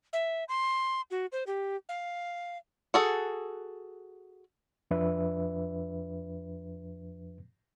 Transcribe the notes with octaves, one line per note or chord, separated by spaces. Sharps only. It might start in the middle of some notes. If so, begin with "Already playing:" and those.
E5
C6
F#4
C5
G4
F5
F#4 G#4 A4
F2 F3 D4 B4 E5